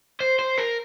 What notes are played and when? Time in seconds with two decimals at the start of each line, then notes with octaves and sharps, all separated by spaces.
0.21 C5
0.39 C5
0.58 A#4